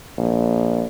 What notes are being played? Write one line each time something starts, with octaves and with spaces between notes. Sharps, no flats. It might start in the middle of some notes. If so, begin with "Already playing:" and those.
A#1